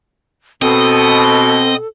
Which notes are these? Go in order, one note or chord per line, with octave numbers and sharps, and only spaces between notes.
B2 C4 A4 D#5